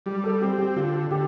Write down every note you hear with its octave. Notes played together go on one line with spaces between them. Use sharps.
G3 G4
A4
C4 G4
G4
D3 F4
D3 G4